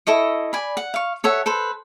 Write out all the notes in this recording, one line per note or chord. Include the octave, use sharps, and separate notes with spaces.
E4 A4 D#5 C#6
D5 G#5 B5
F#5
F5 C#6
A4 C#5 E5 F#5
A4 B4 C5